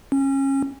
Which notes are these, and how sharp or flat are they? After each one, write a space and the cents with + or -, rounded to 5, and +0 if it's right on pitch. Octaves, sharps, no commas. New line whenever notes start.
C#4 -25